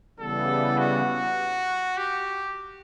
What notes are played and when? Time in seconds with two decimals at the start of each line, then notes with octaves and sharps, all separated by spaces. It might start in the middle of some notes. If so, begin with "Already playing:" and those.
0.19 C#3 E3 G3 B3 A4
0.78 F#4
1.97 G4